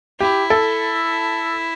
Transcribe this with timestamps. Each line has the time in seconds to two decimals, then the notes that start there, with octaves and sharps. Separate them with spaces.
0.20 E4 G4
0.50 A4